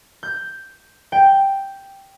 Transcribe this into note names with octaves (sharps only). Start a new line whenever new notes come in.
G6
G5